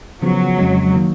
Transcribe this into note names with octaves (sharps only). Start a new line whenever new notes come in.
C#3 F3 F#3 B3
F2 C#3 G#3
D#3 A#3